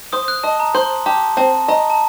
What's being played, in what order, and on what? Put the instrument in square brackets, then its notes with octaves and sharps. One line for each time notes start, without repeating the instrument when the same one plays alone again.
[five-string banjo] C5 [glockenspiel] D#6
[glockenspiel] F#6
[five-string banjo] D#5 [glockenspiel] A5
[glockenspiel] A#5
[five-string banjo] C5 [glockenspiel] C6
[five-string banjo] G4 [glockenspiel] A5
[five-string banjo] C4 [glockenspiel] A5
[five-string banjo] D#5 [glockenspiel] A#5
[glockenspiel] A5